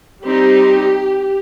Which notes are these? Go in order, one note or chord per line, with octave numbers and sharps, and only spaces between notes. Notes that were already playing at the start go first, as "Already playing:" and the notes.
G3 C4 D#4 G4